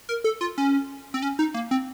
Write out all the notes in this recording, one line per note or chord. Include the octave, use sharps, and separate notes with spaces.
A#4
A4
F4
C#4
C4
C#4
D#4
A#3
C4